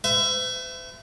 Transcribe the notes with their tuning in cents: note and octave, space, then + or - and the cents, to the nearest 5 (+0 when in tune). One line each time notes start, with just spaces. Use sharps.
C5 -45 E5 +20